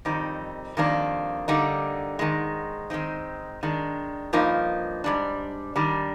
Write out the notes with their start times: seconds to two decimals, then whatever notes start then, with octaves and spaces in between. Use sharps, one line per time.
0.05 F2 D#3 G3 C4 D#4
0.77 F2 D#3 G3 A#3 D4
1.48 D3 G3 A#3 D#4
2.19 G#2 D#3 G#3
2.90 D#3 G#3 C4 D#4
3.63 D#3 G#3 D4
4.33 G2 F3 A#3 D#4
5.04 G#2 G3 D4
5.76 D#3 G3 D4